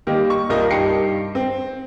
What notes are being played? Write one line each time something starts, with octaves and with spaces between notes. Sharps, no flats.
D#3 G3 A#3 G4
C#6
C2 F4 A#4 D#5 A#6
G2 D#4 G4 G5 C7 C#7
C4